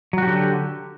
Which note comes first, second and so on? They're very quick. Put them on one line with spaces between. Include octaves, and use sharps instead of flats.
F#3 F#4 G4 D3